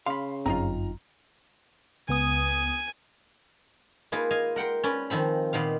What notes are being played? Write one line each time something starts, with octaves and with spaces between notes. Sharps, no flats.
C#3 F5 B5 C6
G1 F#2 C4 D#4 F4 A#5
C#2 B3 G#5 D#6
A#3 D#4 F4 G#4 B4
D#5 F5 G#5
A#4 F#5 G5 C6
C#4 B4 D5
D#3 F3 C4 B5
A#2 D#3 B3 F5